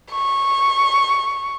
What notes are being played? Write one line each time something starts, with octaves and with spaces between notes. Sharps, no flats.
C#6